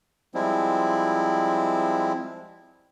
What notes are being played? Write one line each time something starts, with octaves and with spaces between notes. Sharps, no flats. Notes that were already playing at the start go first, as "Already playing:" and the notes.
F3 G3 G#3 C4 E4